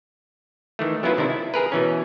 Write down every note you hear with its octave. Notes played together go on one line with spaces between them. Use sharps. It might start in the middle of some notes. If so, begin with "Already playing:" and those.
D#3 E3 A3
F#3 B3 C#4 E4 F4 B4
C3 D#3 D4 E4
E4
G#4 A#4 B4
B2 E3 C#4